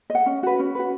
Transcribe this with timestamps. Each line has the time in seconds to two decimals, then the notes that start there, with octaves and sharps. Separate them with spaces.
0.10 D#5
0.15 F#5
0.26 C#4
0.43 F#4 B4
0.59 C#4
0.75 F#4 B4